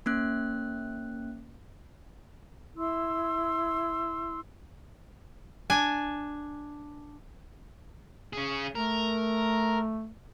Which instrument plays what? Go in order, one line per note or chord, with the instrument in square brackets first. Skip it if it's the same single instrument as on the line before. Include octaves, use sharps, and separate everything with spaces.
[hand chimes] A#3 C#4 F#6
[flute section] E4 C6 E6
[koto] D4 G#5
[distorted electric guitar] C#4 G#4
[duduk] A3 [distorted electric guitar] A#4